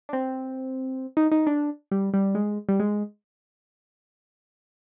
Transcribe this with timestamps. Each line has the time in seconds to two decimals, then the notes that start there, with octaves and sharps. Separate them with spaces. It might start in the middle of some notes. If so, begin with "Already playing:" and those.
0.09 D4
0.13 C4
1.17 D#4
1.31 D#4
1.47 D4
1.91 G3
2.14 G3
2.35 G#3
2.69 G3
2.80 G#3